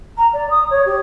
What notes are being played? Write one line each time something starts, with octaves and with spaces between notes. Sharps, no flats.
A#5
D5
D#6
C#5
G4